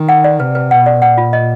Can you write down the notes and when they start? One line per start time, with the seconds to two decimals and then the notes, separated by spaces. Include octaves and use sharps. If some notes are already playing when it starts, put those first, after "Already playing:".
Already playing: D#3
0.09 F#5
0.24 D5
0.40 C3 B4
0.55 B4
0.71 B2 F#5
0.86 D5
1.02 A#2 F#5
1.18 F4
1.33 D#5